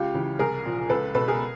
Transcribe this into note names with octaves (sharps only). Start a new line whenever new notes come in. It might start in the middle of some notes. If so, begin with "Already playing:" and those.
Already playing: C#2 F4 G4
C#3 E3
C2 G#4 A#4
A#2 F3
C#2 A4 B4
B2 A4 B4
G#4 A#4